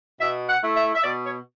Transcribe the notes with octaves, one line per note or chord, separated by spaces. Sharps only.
B2 E5
F#5
A3 E4
E5
E5
B2 D5
C#5